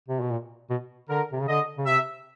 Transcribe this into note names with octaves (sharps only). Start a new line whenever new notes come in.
C3
B2
A#2
B2
D3 A#4
C3
C#3
D3 D#5
C#3
C3 E5